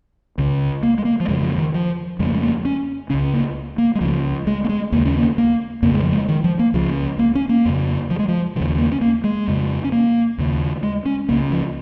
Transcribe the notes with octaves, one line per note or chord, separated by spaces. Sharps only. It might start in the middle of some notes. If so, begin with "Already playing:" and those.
C#2 C#3
A#3
G#3
A#3
F3
F2 C#3 G#3
F3
D#3
F3
F2 C#3 G#3
A#3
G#3
A#3
C#4
C#2 C#3 C#4
A#3
A#3
G#3
C#2 C#3 F3
G#3
A#3
G#3
D#2 C#3 A#3
C#4
A#3
A#3
F2 C#3 A#3
G#3
F3
G#3
D#3
F3
A#3
C#2 C#3 F3
A#3
C#4
A#3
F2 C#3
F3
G#3
F3
D#2 C#3 F3
A#3
C#4
A#3
G#3
F2 C#3
C#4
A#3
D#2 C#3
G#3
C#4
C#2 C#3 A#3
F3